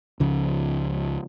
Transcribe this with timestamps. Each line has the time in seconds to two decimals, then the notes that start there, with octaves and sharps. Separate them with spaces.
0.20 C#2 C#3 F3